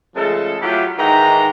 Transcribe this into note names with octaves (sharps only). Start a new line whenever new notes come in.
C#3 F3 G#3 A3 A4
F#3 A3 E4 F4 G4
G#2 D#3 E3 G5 A#5